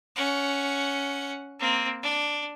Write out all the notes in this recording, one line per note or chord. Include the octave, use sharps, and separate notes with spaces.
C#4 F#5
A#3 C4
D4